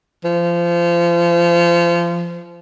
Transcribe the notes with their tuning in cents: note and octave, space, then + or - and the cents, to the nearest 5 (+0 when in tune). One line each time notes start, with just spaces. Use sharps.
F3 -25